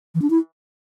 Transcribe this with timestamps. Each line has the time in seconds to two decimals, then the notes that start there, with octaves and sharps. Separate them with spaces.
0.15 E3
0.22 D4
0.30 E4